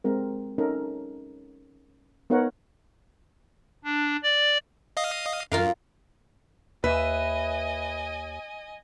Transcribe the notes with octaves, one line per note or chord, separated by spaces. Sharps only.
G#3 C4 A#4
C#4 D#4 A4 A#4
B3 D#4 A#4 C#5 F#5
D4
D5
D#5 F5 D#6
F#2 F4 A#4 F5
D#2 B4 D#5 E5 G#5